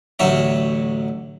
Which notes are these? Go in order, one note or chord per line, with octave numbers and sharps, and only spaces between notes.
A1 D2 F#3 C#4 E5